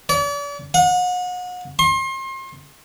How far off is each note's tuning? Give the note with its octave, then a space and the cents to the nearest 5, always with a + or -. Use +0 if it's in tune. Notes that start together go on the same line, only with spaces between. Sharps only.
D5 -45
F#5 -35
C6 +35